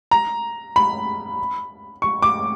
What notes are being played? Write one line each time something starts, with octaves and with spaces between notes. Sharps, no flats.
A#5
B5
C#6
D6